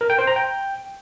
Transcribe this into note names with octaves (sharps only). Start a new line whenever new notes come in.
A#4
G5
C5
A#5
G5